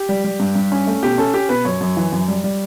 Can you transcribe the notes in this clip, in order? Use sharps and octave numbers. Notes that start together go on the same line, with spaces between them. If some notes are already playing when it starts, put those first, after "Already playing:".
Already playing: G4
G3
G3
G2
G2
C#4
A3
B2 G4
C#4 A4
C#4 G4
B2 B4
F#2 C#5
F#2
E3
F#2
G3
G3